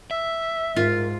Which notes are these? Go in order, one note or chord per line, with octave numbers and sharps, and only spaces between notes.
E5 E6
G#2 F4 A#4